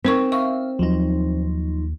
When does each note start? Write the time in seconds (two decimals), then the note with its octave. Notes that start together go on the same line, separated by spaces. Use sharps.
0.05 C4 D#4 A#4 C#6
0.32 E5 F5 C#6
0.79 D#2 F3 F#3 D#4